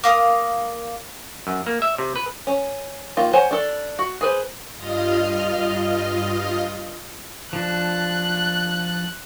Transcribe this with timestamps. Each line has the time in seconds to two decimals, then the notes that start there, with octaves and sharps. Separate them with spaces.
0.04 A#3 F5 D#6
1.47 F#2
1.66 A#3
1.82 E5
1.98 C3
2.16 B4
2.47 C#4
3.17 D#3 A#3 F4
3.33 C5 C#5 F#5 G#5
3.51 D4 A4
3.99 F#4
4.21 G#4 B4 C5
4.77 G2 F4 D#5 D#6 F6
7.53 F3 D4 F#6